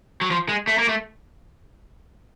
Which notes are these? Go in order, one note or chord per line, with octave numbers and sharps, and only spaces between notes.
F#3
F3
G#3
A3
A#3
A3